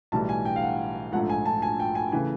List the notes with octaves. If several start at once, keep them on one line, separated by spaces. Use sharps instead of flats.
B1 A2 E3 G3 A5
G#5
G5
F5
F#5
A#1 G#2 F3 A3 F#5
G#5
A5
G#5
G5
G#5
C#3 E3 A3 G#5